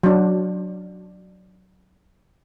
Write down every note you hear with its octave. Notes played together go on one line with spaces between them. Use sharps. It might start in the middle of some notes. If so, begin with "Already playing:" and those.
F#3 D4